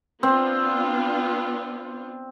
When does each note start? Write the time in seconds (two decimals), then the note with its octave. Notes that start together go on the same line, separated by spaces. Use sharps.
0.23 B3 C4 D4 F4